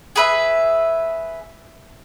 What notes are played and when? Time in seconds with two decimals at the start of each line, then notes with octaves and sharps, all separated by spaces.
0.16 G#4 B4 E5